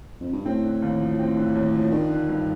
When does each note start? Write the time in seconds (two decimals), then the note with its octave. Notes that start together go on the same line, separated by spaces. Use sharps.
0.20 F2
0.33 G2
0.45 A2 C4
0.64 D3
0.82 D#2
1.00 F3
1.19 C4
1.37 D3
1.55 D#2
1.74 F3
1.91 D#3 D4
2.10 D3
2.29 G2